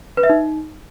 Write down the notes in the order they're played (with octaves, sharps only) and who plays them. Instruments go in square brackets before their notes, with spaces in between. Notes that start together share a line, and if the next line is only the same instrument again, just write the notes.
[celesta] B4
E5
D#4